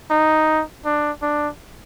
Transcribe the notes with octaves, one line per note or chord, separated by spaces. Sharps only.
D#4
D4
D4